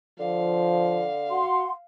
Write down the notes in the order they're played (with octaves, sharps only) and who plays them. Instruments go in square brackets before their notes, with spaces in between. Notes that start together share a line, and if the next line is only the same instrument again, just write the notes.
[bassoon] D3 [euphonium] F3 [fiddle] F5
[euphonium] F#4 [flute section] F#5 C6